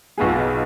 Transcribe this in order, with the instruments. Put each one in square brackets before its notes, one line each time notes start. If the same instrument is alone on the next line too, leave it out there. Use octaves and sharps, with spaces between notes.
[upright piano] B1 B2 B3 F4 G#4